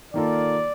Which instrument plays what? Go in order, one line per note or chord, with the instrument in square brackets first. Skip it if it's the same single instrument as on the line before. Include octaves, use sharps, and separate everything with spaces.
[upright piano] D#3 A#3 F4 A4 [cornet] D5